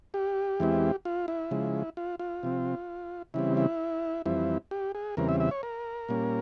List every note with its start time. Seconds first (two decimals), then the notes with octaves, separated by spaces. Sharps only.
0.14 G4
0.60 E2 E3 G#3 C4 E4
1.05 F4
1.28 E4
1.51 C#3 F3 G#3
1.97 F4
2.19 F4
2.43 C3 F3 C4
3.34 C#3 E3 G3 C4 E4
3.57 E4
4.26 F2 E3 G3 C4 E4
4.71 G4
4.95 G#4
5.17 E2 C#3 E3 G3 C4 A#4
5.29 E5
5.40 E5
5.51 C#5
5.63 A#4
6.09 A#2 G3 A#3 C#4